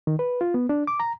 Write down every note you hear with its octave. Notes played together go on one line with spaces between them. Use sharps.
D#3
B4
F4
B3
D4
D6
A#5